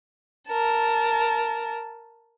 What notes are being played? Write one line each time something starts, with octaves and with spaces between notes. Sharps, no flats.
A#4 A5